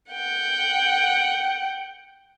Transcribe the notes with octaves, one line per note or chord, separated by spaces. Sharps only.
F#5 G5